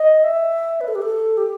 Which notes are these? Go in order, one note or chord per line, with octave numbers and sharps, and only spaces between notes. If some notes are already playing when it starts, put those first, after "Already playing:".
Already playing: D#5
E5
B4
A4
G4
A4
G4